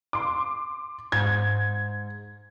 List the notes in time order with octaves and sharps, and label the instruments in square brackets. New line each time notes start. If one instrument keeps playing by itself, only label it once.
[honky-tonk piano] C6 D6
[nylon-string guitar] G#2 [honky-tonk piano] G#6